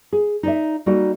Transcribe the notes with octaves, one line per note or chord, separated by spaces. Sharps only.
G#4
D#4 D5 E5
G3 A#3 D#4 F#4 A4